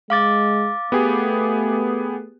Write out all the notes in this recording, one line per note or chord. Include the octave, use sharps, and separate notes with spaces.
G#3 F5 D6 A6
A3 B3 G4 G#4